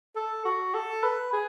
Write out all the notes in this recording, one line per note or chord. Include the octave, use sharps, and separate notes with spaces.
A4
F#4
A4
B4
G#4